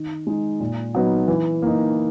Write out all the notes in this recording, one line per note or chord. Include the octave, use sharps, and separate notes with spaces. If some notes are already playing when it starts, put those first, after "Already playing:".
Already playing: D#3
G#3 D#4
A#2
F#3 B3 D#4
E3
A#3 D#4